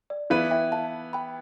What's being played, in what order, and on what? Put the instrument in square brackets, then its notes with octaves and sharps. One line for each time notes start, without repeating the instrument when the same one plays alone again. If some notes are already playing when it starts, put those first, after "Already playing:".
[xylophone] D5
[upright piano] E3 B3 E4 B4 [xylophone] F5
[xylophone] E5 G5
F5 A5
G5 B5